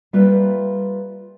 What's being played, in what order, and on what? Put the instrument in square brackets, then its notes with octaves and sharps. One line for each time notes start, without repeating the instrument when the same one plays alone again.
[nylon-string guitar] G3 A#3 F4 A4 B4 E5